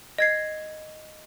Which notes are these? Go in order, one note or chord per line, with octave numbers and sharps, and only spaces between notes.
D#5 G#6 C7